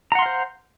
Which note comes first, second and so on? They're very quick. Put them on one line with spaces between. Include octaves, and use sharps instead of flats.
A#5 F#5 C6 F5 C5